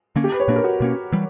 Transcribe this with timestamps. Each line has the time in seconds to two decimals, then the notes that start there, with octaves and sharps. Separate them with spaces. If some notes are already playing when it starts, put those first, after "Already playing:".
0.16 D3 A#3 C#4
0.24 G4
0.32 B4
0.40 C#5
0.48 A#2 A#3 D4 B4
0.56 A#4
0.64 F#4
0.80 B2 A#3 C#4
1.12 E3 G3